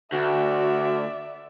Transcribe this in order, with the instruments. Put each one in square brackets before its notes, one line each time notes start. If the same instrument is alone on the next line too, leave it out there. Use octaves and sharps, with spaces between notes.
[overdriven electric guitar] D2 [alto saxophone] F#4 [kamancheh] D5 E5